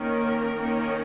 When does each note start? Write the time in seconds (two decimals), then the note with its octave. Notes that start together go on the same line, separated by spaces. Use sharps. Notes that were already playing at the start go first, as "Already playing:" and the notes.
Already playing: D#3 A#3 C#4 A#4
0.55 D#3 A#3 C#4